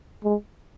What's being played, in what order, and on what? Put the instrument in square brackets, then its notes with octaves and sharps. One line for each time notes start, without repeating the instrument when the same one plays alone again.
[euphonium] G#3